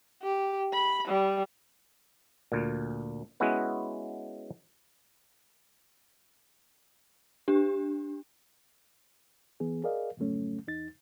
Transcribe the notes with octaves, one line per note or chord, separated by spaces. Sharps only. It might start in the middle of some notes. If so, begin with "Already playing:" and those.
G4
B5
G3
D2 A#2
G#3 B3 C#4 E4 F#4 B4
D4 G4
E3 B3 G#4
G#4 A#4 D5 D#5 F5
F2 G#2 C#3 F#3 A3 C#4
E2 D#4 A6